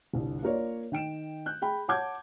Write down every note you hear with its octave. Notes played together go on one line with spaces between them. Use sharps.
G1 C2
A#3 F4 A#4 C#5 D5
D#3 G5 D7 E7
F#6 G6
G#4 G5 B5
C#5 F#5 A5 D6 G6 G#6